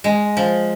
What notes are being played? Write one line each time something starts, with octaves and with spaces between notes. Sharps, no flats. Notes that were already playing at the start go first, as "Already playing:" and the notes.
G#3
F3